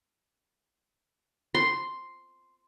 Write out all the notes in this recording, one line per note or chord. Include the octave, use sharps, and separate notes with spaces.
C6